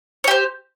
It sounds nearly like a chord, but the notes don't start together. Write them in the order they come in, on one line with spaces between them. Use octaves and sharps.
C#5 G4 C5